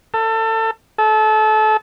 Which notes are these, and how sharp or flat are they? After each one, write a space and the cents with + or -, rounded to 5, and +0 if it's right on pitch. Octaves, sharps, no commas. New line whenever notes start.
A4 +25
A4 -30